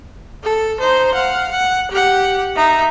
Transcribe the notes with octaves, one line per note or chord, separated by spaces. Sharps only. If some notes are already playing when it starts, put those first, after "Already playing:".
A4
D#4 C5
F5 F#5
F#5
G4 F#5
D#4 E5